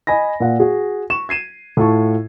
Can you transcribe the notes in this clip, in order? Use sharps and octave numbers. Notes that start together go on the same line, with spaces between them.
D#5 G#5 B5 A#6
A#2 F4 F#5
F#4 G#4
C#6 E7
G#6 C7 D#7 E7
A2 F4 A5 C#6